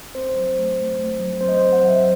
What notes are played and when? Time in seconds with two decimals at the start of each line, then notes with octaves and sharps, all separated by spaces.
0.15 C4 C5
0.35 F#3
0.58 A3
0.78 A3
1.00 A3
1.20 F#3
1.41 C4 C5
1.49 D#5
1.57 F#3 C5
1.73 F#5
1.83 F#3
1.88 E5